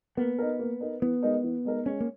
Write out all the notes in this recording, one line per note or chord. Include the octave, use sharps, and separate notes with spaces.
A#3 B3
D#4 A#4
A#3
D#4 A#4
E3 B3
G#3 D#4 A#4
E3
G#3 D#4 A#4
G#3 C#4
A#3